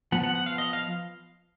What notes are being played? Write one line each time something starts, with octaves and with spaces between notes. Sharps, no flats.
F3 B3 F#5
F#5
F#5
F5
D#5
F5